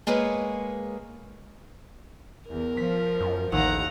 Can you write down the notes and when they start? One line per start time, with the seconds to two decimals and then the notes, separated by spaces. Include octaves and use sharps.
0.07 G#3 A#3 G#4 B4 C#5
2.48 E2 A#4
2.77 F3 B6
3.21 F#2
3.52 A1 D#2 F#5 A#5